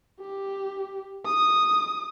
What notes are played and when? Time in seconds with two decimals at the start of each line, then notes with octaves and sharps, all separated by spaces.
0.20 G4
1.26 D#6